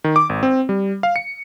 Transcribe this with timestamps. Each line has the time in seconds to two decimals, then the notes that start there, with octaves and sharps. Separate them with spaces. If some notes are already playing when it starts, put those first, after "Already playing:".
0.04 D#3
0.16 D6
0.29 G#1
0.43 C4
0.69 G3
1.03 F5
1.16 C#7